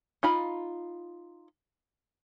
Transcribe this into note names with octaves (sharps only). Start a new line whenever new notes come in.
D#4 F4 B5